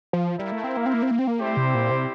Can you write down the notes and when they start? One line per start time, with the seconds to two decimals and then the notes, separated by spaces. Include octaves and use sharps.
0.13 F3
0.39 G3 E4 A#4 F5
0.52 A3
0.64 C4
0.77 A#3
0.86 C4
0.94 A#3
1.03 C4
1.11 A#3
1.19 C4
1.27 A#3
1.40 G3 A3 C4 E4 G4 C5
1.57 C3
1.74 A#2
1.91 C3